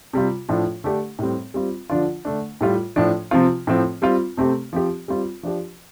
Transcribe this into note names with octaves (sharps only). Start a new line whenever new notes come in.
C3 G3 F4
A2 F3 D4 F4
D3 A3 D4 G4
A2 G3 C4
G3 C4 F4
D3 F3 D4 F4
D3 A3 D4
A2 G3 F4
A2 F3 D4
C3 F3 C4 F4
A2 F3 C4
G3 C4 F4
C3 A3 C4 G4
F3 C4 G4
G3 C4 F4
F3 D4 G4